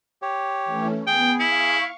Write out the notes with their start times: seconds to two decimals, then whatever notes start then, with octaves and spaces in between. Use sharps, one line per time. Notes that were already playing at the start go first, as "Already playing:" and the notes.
0.22 G4 C#5
0.65 E3 A3 C#4
1.07 B3 G#4 G5
1.40 E4 F5 C#6